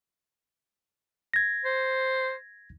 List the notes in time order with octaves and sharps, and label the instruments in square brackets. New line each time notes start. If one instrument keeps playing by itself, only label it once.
[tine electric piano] G#6 A#6
[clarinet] C5